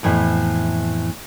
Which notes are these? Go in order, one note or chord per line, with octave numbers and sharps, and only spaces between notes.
F2 A2 E3 B3